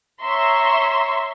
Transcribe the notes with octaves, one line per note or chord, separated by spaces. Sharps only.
C#5 E5 A#5 C6 C#6